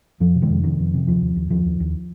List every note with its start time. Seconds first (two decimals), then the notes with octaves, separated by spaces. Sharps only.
0.20 F2 F3
0.35 C3
0.42 D#3 G#3
0.50 F2
0.64 C3 D#3
0.79 F2
0.94 C3
1.07 D#2 F3
1.21 D#2
1.36 D#2
1.50 D#2 F3
1.65 D#2
1.80 D#2